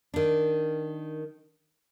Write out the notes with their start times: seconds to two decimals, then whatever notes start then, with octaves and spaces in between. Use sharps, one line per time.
0.14 D#3 D4